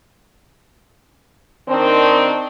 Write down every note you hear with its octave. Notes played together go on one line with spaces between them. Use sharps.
D#3 C4 D4